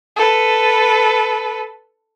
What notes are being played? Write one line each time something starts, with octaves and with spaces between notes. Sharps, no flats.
A4 B4